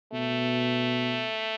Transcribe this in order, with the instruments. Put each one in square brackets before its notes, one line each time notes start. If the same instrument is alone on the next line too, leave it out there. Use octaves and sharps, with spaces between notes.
[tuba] B2 [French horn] A3